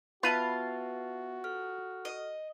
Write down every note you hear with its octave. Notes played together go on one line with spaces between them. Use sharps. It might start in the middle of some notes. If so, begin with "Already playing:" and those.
B3 F4 F#4 B4 E5 F5 A5
A4 F6
D#5